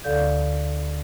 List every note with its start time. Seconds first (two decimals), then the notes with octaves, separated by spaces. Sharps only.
0.04 D2 D3 A4 D5 F5 G6